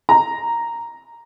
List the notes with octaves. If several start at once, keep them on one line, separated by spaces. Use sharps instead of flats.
A#5